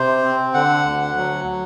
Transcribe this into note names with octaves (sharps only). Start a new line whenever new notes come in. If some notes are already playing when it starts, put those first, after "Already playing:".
Already playing: C3 C5
C4
D3 F#5
D2
F#3